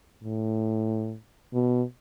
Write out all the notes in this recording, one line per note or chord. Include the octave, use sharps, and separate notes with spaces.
A2
B2